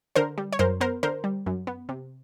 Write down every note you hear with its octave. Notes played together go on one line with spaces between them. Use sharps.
D3 A#4 C5
G3
C#5
F#2 A#4 C5
B3 A#4 C5
D3 A#4 C5
G3
F#2
B3
C3